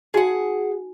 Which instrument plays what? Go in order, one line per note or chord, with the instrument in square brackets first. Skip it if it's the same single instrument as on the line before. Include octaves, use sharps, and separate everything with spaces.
[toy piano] D#4 F#4 G#5 [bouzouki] G#4 F#5